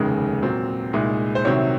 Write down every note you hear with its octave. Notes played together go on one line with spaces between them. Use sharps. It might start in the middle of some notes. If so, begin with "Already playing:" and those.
Already playing: F1 D#2 C#3 G#3 D#4
A#2 F#3 C4
C2 A#2 G#3 D#4
C5
C2 C3 D#3 F#3 C4 C#5